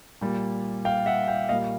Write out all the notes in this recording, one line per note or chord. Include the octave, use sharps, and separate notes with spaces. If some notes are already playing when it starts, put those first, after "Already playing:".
A#2 G3
F5 G5
E5 F#5
F5 G5
A#2 G3 D#5 F5